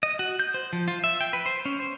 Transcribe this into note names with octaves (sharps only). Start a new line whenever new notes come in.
D#5
F#4
G6
C5
F3
F4
E5
G5
B4
C5
C#4
C5